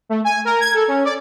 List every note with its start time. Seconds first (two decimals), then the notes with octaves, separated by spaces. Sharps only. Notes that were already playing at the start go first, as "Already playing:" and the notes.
0.09 A3
0.24 G#5
0.45 A#4
0.60 G#6
0.74 A4
0.88 C#4
1.05 D5